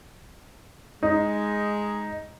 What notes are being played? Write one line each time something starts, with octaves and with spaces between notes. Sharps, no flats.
G#3 D#4